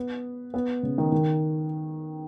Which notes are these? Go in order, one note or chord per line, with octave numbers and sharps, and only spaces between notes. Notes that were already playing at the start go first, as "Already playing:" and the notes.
Already playing: B3
B3
C#3
D#3
D#3